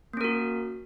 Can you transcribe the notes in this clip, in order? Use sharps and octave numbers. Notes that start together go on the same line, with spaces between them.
A#3 C#4 F#4 A#4